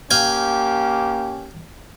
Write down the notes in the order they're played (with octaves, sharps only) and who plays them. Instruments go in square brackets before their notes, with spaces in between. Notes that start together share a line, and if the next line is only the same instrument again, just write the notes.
[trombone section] A#3 C#4 G4 [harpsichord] F5 G5 G#5